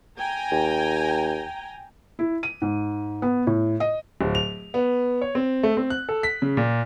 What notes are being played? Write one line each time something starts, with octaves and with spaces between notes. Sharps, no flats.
G5 G#5 A#5
D#2
E4
D#7
G#2
B3
A2
D#5
D1
F7
B3
C#5
C4
A3
C4
F#6
A4
B6
C#3
A#2